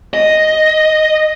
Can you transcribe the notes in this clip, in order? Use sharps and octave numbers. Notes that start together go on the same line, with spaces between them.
D#5